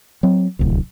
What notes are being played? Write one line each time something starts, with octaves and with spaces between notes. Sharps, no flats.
F#3 C4
D1 C2